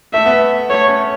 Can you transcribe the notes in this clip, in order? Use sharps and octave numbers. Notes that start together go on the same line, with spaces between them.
A3 E5
B3
A3
A3 C#5
A3 C#4